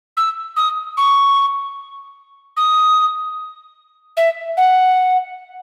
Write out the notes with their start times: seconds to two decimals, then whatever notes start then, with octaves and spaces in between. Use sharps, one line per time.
0.17 E6
0.57 D#6
0.97 C#6
2.57 D#6
4.17 E5
4.57 F#5